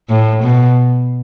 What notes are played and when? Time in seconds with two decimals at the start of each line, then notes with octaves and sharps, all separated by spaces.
0.09 A2
0.43 B2